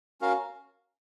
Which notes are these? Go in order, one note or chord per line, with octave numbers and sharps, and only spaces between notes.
C#4 F#4 A#4 F5